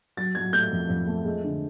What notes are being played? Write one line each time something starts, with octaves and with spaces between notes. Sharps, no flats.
F#3 A6
F#3 G#6
A3 G6
F2
F2
A3
G#3
D3